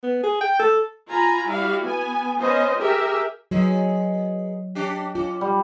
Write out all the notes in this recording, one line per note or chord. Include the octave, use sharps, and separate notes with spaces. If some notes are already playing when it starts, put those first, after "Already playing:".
B3
G#4
G5
A4
F4 G#5 A#5 B5
G3 E4 F#4 F5
B3 G#5
B3 C#4 C5 D#5
G4 G#4 A#4 E5
F#3 B3 D#4 G#4
C#4 D4 G4
C#4 F4
G3